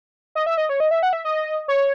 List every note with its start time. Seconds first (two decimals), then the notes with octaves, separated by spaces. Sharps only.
0.35 D#5
0.46 E5
0.57 D#5
0.69 C#5
0.80 D#5
0.91 E5
1.03 F#5
1.13 E5
1.25 D#5
1.68 C#5